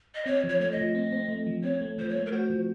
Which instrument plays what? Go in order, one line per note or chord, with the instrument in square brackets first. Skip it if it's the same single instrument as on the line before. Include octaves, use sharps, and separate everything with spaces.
[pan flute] D#5
[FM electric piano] C4 [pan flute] C#5
[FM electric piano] F3
[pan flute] C#5
[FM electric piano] A3 [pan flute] C#5
[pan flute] D#5
[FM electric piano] F3
C4
C4
A3
F3
[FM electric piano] C4 [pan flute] C#5
[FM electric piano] A3
[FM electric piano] F3 [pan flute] C5
[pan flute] C#5
[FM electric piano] A3
[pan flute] A#4
[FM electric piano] F#4 [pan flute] C5
[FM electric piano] F3